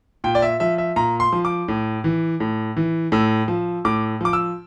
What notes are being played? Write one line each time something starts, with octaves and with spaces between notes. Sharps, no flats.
A#2 G5
D5
E5
F3 E5
E5
A#2 A#5
C6
F3
D6
A2
E3
A2
E3
A2 E6
F3
A2 D6
F3 D6
E6